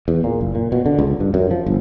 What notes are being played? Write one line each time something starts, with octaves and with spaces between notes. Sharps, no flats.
E2
A#2
F#1
A#2
B2
D3
C#2
G2
F#2
F3
G1